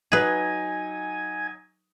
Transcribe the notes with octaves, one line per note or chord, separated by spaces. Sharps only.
F#3 D#4 G#4 B4 G#5